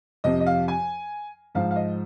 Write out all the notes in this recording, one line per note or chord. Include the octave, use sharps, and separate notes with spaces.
F2 C3 F3 D#5
D#5
F5
G#5
G#2 F3 F5
F5
D#5